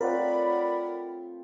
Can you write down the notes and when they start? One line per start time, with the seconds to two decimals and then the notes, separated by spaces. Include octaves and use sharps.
0.01 A3 C4 F4 A#4 C#5 D5 F#5 B5